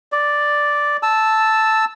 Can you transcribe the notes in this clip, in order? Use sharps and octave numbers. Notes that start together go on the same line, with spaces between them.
D5
A5 E6